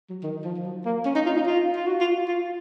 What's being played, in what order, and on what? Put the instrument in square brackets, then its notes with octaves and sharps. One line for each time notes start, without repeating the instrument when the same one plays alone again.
[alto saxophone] F#3
D#3
F3
F3
F#3
A#3
C#4
D#4
F4
D#4
F4
F4
F#4
F4
F4